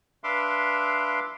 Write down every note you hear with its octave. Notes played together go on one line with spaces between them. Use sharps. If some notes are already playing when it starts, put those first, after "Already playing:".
D4 B4 E5 F5 C6 D6